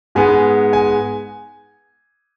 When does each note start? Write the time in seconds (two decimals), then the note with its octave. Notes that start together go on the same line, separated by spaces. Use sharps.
0.15 G#2 G#3 B3 G#5
0.73 G#5